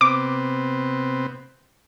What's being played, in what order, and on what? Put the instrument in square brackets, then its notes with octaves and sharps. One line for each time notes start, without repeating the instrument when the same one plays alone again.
[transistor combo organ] C3 B3 C4 [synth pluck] D6